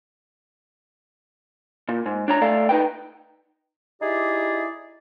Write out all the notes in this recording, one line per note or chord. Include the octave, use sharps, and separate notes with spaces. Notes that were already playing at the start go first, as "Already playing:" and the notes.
A#2
G#2
D4 C#5 A#5
A3 A4 D5 F5
D#4 B4 G5
D#4 E4 G4 G#4 D5 E5